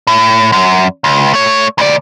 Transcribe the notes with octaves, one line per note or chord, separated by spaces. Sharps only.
A2
F#2
C#2
A3 C#5
D2 D5